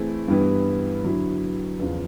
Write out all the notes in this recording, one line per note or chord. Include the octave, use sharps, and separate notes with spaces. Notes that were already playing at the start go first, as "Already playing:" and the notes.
Already playing: E3 A3 C4 E4 G#4
G2 E3 G3 B3 E4
D3 F#3 B3 E4
E2 C#3 F3